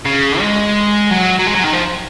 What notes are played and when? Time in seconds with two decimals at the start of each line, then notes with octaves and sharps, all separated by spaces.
0.05 C#3
0.40 G#3
1.11 F#3
1.39 F#3
1.47 G#3
1.55 F#3
1.64 D#3
1.73 F3